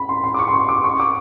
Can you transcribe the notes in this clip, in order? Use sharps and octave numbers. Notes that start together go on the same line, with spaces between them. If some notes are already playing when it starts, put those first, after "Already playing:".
Already playing: B5
C6
C6
D6
C#6
C6
C#6
D6
C#6
D6